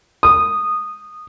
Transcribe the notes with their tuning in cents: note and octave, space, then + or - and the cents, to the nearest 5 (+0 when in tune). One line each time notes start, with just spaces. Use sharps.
D#6 -15